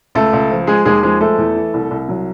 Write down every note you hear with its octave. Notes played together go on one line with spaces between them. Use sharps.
C#2 A3 A4
C#2
F3
G#3 G#4
D#2 G#3 G#4
F3 G#3 G#4
G#3 A3 A4
E2
E3
C2
C2
F#3